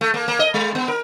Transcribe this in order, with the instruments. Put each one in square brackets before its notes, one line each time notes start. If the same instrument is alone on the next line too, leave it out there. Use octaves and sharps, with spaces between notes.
[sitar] A3
A#3
A#3
D#5
G#3
B3
A#4